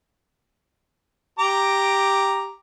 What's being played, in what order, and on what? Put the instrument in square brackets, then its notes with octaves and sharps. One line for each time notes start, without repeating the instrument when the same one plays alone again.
[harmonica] G4 A#5 D6